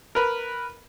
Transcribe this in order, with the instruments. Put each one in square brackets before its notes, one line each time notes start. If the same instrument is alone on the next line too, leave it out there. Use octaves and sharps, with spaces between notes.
[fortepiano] A#4 B4